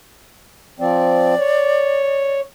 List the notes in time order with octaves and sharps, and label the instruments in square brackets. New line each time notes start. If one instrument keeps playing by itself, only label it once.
[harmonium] F3 C4 [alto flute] D5
[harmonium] C#5